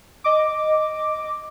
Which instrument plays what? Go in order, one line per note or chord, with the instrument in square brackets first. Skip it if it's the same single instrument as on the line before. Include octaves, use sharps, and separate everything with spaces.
[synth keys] D#5 D6